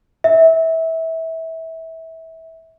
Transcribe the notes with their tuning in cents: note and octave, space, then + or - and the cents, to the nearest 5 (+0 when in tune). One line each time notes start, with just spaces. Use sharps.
E5 -25